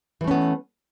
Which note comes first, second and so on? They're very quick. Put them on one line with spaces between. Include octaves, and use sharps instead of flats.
E3 A3 C#4 B3